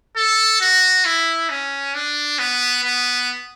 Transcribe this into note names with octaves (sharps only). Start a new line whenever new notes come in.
A4
F#4
E4
C#4
D4
B3
B3